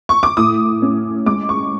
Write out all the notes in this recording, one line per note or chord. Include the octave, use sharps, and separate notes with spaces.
C#6
D6
A2 D#6
C#4
G#3 D6
C#6